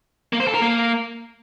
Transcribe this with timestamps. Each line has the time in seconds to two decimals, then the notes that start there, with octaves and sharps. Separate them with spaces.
0.33 A#3
0.40 C5
0.47 A4
0.54 A#4
0.62 A#3